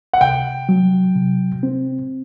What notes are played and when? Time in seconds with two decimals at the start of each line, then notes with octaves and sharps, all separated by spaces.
0.13 F#5
0.21 C3 G5
0.69 F#3
1.15 C3
1.63 C4